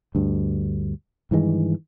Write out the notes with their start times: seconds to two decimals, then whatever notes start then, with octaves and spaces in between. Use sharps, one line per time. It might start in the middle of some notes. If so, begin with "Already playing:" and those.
0.15 D2 G2
1.31 G2 D#3 E3 G#3